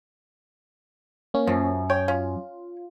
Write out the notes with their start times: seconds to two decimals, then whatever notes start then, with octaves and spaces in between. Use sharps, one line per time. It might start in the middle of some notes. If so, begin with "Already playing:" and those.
1.34 A#3 C#4
1.47 F#2 F3
1.90 C#5 G5
2.08 C#4 F4